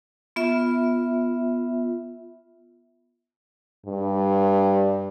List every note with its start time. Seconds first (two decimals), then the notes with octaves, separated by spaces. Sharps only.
0.36 B3 F4 E5
3.86 G2